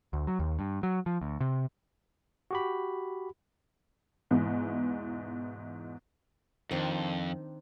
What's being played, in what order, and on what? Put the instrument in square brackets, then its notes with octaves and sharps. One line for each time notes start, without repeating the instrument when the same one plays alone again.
[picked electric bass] D2
F#3
D#2
G2
F#3
F3
D2
C3
[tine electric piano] F#4 G4 B5
[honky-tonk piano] E2 G#2 B2 E3
[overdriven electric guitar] F2 [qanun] D#3 C4 D4